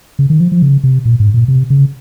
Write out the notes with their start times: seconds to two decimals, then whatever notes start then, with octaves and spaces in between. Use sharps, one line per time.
0.19 C#3
0.30 D#3
0.40 F3
0.52 F3
0.62 C#3
0.84 C3
1.05 A#2
1.20 G#2
1.34 A#2
1.48 C3
1.70 C#3